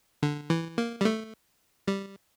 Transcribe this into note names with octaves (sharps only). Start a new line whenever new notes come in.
D3
E3
A#3
G3
A3
G3